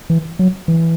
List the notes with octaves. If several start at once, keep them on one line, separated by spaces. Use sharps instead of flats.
E3
F#3
E3